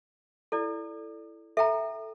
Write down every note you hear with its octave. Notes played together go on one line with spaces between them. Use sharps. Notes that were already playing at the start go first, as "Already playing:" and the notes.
E4 A4 D5
A4 E5 G5 A#5